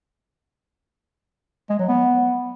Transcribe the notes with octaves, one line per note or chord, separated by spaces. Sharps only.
G#3
F#3
B3